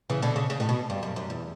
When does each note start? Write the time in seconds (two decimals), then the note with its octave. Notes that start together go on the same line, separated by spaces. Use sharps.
0.10 C#3 E3
0.22 B2 D3
0.36 C#3
0.50 C#3
0.60 A2
0.69 B2
0.90 G2
1.03 F#2
1.16 F#2
1.30 E2